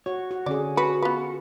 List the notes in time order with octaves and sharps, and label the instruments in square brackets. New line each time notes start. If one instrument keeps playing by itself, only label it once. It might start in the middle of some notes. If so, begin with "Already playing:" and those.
[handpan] F#4 [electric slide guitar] C#5
[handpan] F#4
[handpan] D3 C#4 G#4 [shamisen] D5
[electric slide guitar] F#4 [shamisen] B4
[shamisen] B3 B4 [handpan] F4